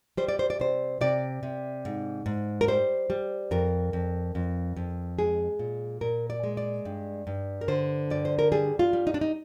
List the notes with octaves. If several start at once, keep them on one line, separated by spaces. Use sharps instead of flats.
G3 C5
D5
C5
D5
C3 C5
C3 D5
C3
G#2
G#2
A#4
G3 C5
G3
F2 A#4
F2
F2
F2
G#3 G#4
A#2
A#2 A#4
D5
G#3
D5
G2
G2
A#4
D3 C5
G2 D5
C5
A#4
G3 G#4
F4
G3
D#4
D4
D#4